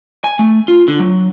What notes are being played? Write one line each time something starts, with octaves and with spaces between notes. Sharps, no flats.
G#5
A3
F4
D3
F#3